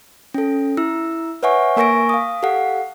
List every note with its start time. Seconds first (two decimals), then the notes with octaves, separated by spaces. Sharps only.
0.34 C#4 A4
0.77 E4 E6
1.43 B4 C#5 E5 F#5 G#5 C#6
1.76 A#3 A#4 G#5 C#6 A#6 D7
2.09 F5 D#6
2.43 G4 A4 F5 F#5